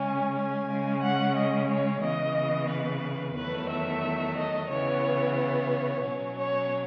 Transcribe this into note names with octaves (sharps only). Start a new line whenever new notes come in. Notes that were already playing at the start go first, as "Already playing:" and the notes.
Already playing: C#3 G#3 C#4 G#5
G#5
C#3 G#3 C#4
F#5
D#5
C#5
C#3 E3 B3 D#5
B4
E2 D#3 F#3 A3 B4
E5
D#5
C#3 E3 B3 C#5
C#5
B2 F#3 C#4
C#5